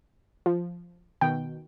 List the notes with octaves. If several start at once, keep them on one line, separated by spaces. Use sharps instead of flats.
F3
B2 D#3 G5